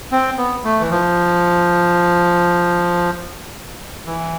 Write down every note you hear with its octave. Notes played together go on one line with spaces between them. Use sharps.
C4
B3
A3
E3
F3
E3